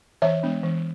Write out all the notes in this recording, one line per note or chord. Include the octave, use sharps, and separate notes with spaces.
E3 C#5 E5
G#3 B3 D4
E3